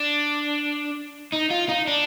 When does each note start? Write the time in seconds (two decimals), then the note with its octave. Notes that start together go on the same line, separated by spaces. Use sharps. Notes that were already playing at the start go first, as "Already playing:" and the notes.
Already playing: D4
1.33 D#4
1.51 F4
1.69 D#4
1.87 D4